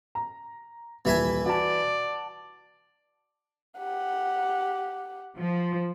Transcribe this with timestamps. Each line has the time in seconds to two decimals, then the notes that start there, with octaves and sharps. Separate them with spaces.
0.15 A#5
1.05 D#1 C2 E3 G3 E5 G#5
1.46 F#4 D5 A5
3.78 G4 F#5
5.38 F3